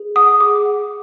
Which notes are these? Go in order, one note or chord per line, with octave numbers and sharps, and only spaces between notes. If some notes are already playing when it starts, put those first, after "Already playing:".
Already playing: G#4
F#5 D#6
G#4 D6
F#5